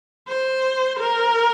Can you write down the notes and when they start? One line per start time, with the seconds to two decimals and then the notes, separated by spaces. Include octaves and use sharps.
0.28 C5
0.99 A#4